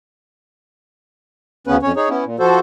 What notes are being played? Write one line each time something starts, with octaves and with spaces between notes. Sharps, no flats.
D2 C#3 B3 C#4 B4
F2 C#4 C#5
D#4 G#4 C#5
B3 C#4 E4
A#2
F3 F#4 A4 C5